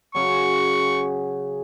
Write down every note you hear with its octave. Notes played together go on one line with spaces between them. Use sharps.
C#3 F#3 C#6